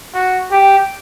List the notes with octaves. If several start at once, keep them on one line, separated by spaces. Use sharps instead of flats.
F#4
G4